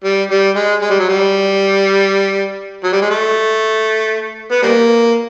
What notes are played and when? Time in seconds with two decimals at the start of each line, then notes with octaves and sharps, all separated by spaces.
0.04 G3
0.31 G3
0.56 G#3
0.82 G#3
0.90 G3
1.00 F#3
1.09 G3
2.84 F#3
2.93 G3
3.02 G#3
3.10 A3
4.51 B3
4.63 G3 A#3